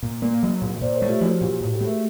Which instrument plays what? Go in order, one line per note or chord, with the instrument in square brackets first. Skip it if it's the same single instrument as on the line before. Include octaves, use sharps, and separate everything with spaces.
[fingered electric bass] A#2
A#3
F#3
A#2
[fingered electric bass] A#2 [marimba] C5 D5
[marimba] C#5
A#4 C5
[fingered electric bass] A3
[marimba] F4 G4
[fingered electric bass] F3 [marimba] E4 F#4
[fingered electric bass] A#2 [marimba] F4 G4
[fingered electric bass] A2
[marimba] G4 A4
[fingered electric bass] A3
[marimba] G#4 A#4